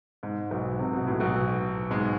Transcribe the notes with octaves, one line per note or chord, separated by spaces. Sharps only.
G#2
B1 B2
C3
B2
A2
B1 B2
G#2 G#3